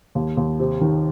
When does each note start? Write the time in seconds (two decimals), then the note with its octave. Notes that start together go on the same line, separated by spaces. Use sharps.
0.15 D#2
0.37 D#2
0.59 C3
0.81 D#3